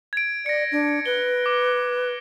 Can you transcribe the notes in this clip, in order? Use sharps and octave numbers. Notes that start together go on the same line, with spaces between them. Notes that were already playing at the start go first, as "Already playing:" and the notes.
G#6 D7
D5 A#6 C#7
D4
B4 G7
D6